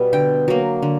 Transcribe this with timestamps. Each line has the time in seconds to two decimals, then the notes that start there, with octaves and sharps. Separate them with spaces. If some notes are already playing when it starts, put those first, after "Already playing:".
Already playing: B2 G3 B3
0.13 D3 G5
0.48 F#3 A#3
0.82 D3